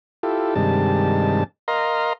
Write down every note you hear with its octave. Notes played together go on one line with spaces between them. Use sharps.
E4 F4 G4 A4
G2 C3 D#3 G3 G#3 A5
A#4 D#5 F5 A#5 C6